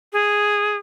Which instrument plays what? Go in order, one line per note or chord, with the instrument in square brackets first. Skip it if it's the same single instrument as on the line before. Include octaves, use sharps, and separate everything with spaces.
[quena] G#4